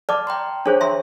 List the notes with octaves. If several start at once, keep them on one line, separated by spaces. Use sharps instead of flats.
D5 A5 D6 F6
G5 A#5 C6
D4 G#4 C5 C#5
E5 A#5 C6